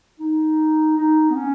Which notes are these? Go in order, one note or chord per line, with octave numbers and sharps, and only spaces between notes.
D#4
D#4
B3
C#4